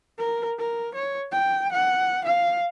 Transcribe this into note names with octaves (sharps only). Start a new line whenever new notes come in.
A#4
A#4
C#5
G5
F#5
F5